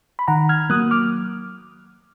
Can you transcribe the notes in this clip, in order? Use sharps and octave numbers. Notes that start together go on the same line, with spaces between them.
B5
D#3 F#5 A#5
F6 G#6
F#3 A#3 D#6 F#6
D6 F6